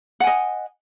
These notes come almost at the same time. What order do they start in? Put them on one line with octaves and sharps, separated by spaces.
F#5 G#5 D#5